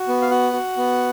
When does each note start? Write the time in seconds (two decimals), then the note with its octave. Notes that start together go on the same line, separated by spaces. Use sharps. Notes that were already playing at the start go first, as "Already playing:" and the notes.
Already playing: F#4
0.08 B3
0.22 F5
0.31 F#4 F#5
0.53 F#4
0.77 B3